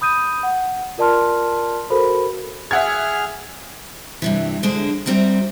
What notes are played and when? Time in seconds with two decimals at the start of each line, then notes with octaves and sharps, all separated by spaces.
0.01 B5 D#6 G6 D#7
0.43 F#5
0.98 F4 A#4 D5 A5 C6 F6
1.90 F#4 A4 A#4 C5 F5 B5
2.71 G#4 E5 F#5 F6 G#6
4.22 G2 C3 E3
4.63 D3 G#3 D4 G#4 C5
5.06 C3 G3 C4 F#4 A#5